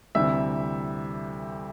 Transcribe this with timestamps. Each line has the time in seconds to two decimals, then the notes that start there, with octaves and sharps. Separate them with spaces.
0.15 D2 C3 E3 G3 E5 E6